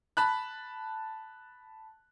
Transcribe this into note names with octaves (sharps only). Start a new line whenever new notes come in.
A5 B5 F#6